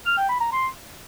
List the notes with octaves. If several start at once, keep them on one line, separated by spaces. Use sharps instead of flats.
F6
G5
B5
A#5
C6